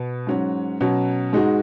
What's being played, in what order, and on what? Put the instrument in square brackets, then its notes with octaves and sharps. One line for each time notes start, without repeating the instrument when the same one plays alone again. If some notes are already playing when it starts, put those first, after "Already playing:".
Already playing: [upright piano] B2 B3
G#2 F#3 C#4 F#4
B2 F#3 C#4 F#4
G#2 G#3 D#4 F#4